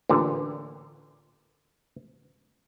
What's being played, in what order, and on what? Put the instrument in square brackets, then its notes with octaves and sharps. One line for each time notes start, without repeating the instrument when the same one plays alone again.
[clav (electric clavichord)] A1 A#2 D3